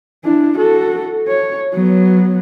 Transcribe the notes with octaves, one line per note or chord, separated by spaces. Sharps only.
D4 E4
F#4 A4
C#5
F#3 B3